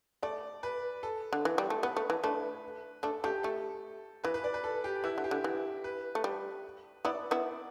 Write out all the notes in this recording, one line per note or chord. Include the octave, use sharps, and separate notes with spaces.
A3 D5
B4
A4
D3
E3
G3
A3
B3 B4
A3
E3
A3 D4 B4
A3 D4 A4
A3 D4 G4
A3 A4
E3 B4
B4
D5
B4
A4
G4
E3 E4
D3
G4
D3
E3
B4
A3
G3
B3 E4 D5
B3 E4